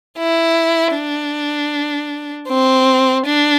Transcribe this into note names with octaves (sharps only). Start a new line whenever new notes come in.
E4
D4
C4
D4